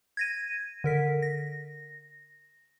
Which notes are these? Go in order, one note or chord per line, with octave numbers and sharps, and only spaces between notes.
G#6 A#6 D#7
D3 A#4 B6
A#6